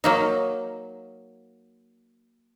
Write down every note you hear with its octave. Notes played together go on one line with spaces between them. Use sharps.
F#3 A#3 D#4